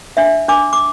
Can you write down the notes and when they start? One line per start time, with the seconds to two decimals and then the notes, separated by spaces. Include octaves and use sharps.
0.17 D4 E5
0.48 D4 D6
0.73 D6